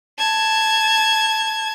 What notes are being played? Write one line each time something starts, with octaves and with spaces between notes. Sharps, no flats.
A5 G#6